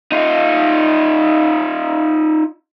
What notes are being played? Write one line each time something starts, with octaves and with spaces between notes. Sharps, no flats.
D#4 F4